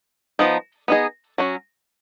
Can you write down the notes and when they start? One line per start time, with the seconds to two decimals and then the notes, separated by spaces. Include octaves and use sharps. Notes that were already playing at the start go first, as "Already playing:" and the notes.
0.39 F3 B3 D#4
0.88 B3 D#4 G#4 D#5
1.38 F#3 C#4 F#4